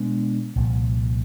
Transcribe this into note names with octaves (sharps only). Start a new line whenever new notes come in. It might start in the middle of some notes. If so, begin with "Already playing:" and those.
Already playing: B2 G#3 B3 D4
C2 A#2 F3